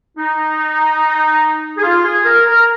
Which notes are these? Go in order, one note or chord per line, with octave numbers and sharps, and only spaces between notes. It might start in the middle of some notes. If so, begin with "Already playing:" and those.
D#4
G#4
F4
G#4
A#4
A#4